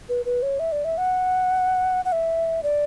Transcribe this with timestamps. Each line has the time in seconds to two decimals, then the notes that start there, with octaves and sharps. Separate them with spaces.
0.09 B4
0.26 B4
0.43 C#5
0.59 E5
0.72 D5
0.85 E5
0.98 F#5
2.05 F#5
2.12 E5
2.63 D5